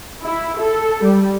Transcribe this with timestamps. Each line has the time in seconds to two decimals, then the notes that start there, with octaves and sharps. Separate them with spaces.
0.23 E4
0.59 A4
1.03 G3